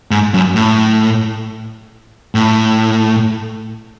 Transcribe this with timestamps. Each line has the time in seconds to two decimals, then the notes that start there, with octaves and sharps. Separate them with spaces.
0.11 G#2
0.34 F#2
0.56 A2
2.35 A2